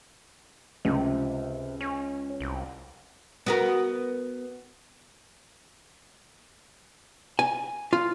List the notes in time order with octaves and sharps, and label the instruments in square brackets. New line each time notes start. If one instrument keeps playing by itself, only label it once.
[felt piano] C#2 [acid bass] C3
[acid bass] C#4
C2
[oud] B3 F#4 A#4
[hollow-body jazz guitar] G#5
F4